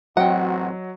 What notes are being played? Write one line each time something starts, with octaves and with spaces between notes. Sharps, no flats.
A1 F#3 C4 F#4 D#5 F#5 G5